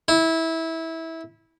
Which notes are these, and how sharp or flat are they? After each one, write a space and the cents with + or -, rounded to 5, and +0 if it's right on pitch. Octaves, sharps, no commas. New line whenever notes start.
E4 -20